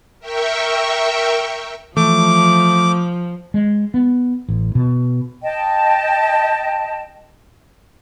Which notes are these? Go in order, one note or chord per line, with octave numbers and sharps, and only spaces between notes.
A#4 E5 G5 C#6
E3 F3 A3 D6
G#3
B3
A1
B2
D#5 G5 A5